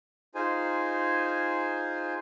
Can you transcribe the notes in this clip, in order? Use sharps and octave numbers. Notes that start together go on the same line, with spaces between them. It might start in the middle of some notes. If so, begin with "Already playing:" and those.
D#4 F4 G#4 C5 G#5